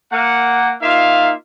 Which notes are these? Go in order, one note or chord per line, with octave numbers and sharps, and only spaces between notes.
A#3 F#5
A#3 D#4 F4 E5 F5